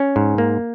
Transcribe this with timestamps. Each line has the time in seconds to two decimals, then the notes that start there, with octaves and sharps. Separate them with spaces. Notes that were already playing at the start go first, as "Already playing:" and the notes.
Already playing: C#4
0.16 G#2
0.38 A#3